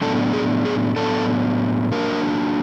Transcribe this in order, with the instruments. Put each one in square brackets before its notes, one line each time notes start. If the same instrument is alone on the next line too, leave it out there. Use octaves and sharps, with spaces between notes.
[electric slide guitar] A2 F#3 B3 D4 A4
G#4
G#4
A2 F#3 B3 D4 A4
F#3 A#3 D4 A#4